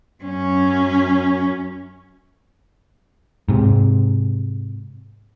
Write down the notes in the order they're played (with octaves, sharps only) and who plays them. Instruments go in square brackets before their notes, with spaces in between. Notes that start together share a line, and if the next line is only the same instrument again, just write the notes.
[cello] F#2 C#4
[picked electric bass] G#2 C3